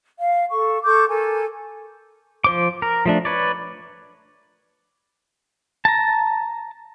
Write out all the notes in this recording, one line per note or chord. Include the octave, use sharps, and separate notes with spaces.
F5
A4 C#6
A4 C#6 D6 G6
A4 A#4 G#5
F3 C5 D6
A#4
F3 A3 D4
B4 C#5 D5
A5 A#5